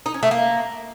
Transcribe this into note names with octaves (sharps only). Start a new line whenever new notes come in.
D#4
C#4
A3
A#3